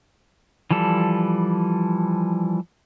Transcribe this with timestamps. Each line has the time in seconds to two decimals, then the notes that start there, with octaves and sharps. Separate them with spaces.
0.71 E3 F3 G3 A4